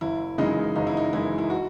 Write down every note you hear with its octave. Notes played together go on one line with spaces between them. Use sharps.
F#1 E4
F#2 C#3 E3 G#3 D#4
F#1 D#4
E4
D#4
F#2 C#3 E3 G#3 E4
E4
F#4